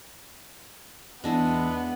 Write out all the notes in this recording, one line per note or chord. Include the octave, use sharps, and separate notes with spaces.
E2 G#3 B3 D4 E4